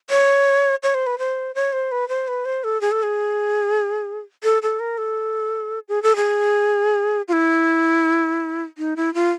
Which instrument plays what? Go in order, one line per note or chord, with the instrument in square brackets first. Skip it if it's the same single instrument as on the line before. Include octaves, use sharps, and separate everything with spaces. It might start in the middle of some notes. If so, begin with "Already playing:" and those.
[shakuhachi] C#5
C#5
C5
B4
C5
C#5
C5
B4
C5
B4
C5
A4
G#4
A4
G#4
A4
A4
A#4
A4
G#4
A4
G#4
F4
E4
D#4
E4
F4